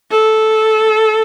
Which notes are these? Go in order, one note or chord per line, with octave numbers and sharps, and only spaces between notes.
A4